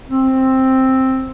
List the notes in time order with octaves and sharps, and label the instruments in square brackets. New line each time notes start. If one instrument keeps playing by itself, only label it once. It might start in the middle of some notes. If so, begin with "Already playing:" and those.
[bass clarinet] C4